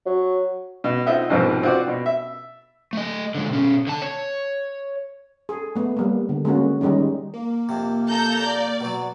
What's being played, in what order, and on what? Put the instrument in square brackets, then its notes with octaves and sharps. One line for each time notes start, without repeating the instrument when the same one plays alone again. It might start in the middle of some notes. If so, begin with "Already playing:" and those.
[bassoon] F#3
[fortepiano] B2
C4 D#4 F4 D#5 E5 F#5
C2 G#2 B2 F3 C4
C4 F4 F#4 C5 D5
B2
E5
[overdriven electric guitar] A3 D#5
D3 G#3
B2 C#4
D3 A5
C#5
[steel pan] G#4 A4
A3 B3
G3 A#3
D3
G#3 A#3 C#4 F#4
D#3 G3 G#3 C#4 D#4
[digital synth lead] A#3
[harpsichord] F2 C3
[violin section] A4 A#5 G6
D5
[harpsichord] B2 F#3